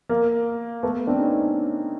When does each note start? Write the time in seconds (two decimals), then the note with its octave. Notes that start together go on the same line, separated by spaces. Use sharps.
0.09 A#3
0.83 A3 B3
1.07 C4 D4
1.19 C#4 D#4